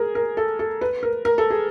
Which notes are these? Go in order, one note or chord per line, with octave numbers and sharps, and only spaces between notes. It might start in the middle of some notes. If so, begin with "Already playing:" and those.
Already playing: G#4 A#4
A#4
A4
A4
B4
A#4
A#4
A4
G#4